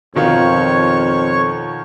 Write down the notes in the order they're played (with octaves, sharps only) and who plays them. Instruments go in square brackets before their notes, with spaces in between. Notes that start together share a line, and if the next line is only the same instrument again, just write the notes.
[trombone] F2 [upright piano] B2 D#3 F4 [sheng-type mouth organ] C#5 C#6